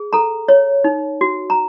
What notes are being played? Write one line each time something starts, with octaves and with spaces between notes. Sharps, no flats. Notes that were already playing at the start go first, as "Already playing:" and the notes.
Already playing: G#4
A4 A#5
C#5
D#4
F#4
A#5